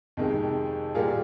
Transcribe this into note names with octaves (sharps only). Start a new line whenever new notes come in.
F2 C3 D#3 G#3
A#2 G3 A#3 F4 G#4